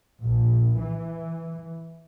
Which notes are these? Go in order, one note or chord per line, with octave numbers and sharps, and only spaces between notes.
A#1
E3